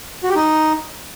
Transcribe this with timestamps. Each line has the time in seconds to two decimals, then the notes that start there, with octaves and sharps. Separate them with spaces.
0.24 F#4
0.30 G4
0.35 D#4